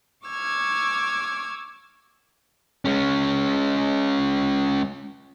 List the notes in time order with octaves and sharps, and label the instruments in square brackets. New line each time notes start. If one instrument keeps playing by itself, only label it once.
[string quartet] C#6 D6 E6 F6 G#6
[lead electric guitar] G#3 C#4